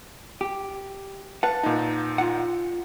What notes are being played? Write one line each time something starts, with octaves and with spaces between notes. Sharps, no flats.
G4
B4 F5 F#5 A5
A#2 D#4
F4 F#5